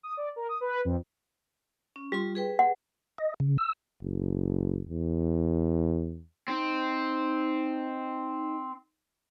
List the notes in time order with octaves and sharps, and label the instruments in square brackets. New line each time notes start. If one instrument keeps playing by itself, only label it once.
[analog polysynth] D#6
D5
A#4
D#6
B4
F2
[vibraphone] C#4
[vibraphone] G3 F4 C6 [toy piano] G4
[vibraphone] G#4 B4 G5
[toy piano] F#5
[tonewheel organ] D#5
C#3
E6
[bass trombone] F#1
E2
[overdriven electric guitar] C4 [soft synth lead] D#4